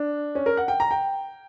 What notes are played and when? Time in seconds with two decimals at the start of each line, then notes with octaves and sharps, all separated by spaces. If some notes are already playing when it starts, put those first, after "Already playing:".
Already playing: D4
0.35 C#4
0.46 A#4
0.57 F#5
0.68 G5
0.80 A#5
0.91 G5